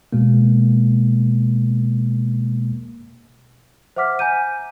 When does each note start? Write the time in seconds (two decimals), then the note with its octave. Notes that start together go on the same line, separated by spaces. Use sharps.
0.13 B2 G#3 A#3
3.96 C5 E5 F#5 D6 F6 B6
4.19 G#5 A#5 G6 D#7